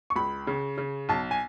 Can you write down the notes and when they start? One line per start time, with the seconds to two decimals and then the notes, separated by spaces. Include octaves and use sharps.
0.10 C#6
0.16 C#2 B5
0.47 C#3
0.78 C#3
1.09 B1 A5
1.31 G#5